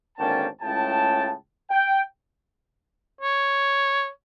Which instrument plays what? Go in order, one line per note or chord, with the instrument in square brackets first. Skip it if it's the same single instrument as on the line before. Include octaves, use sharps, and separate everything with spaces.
[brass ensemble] G#1 D3 A#3 C#4 G5 A5
C#2 A2 C#3 G5 A5
G5
[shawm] C#5